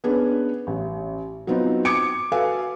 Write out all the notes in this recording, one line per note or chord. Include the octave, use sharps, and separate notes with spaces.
B3 C#4 D4 G#4 B4
A1
F#3 B3 C4 D#4 F4
D6 D#6 G#6 C#7 D7
F#4 A4 B4 F5 G#5